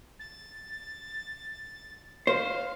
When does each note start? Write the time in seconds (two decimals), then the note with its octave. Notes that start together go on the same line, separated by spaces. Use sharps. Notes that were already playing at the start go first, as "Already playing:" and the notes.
0.19 A6
2.27 C5 F5